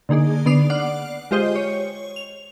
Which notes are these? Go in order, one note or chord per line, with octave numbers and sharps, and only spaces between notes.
D3 A#3 D#4 G#4 D5
D3 B3 D5 D#6 C7 F7
D5 F#5 D6 F6 C7
G#3 F4 G4 C5 D#5 G5
C#5
F7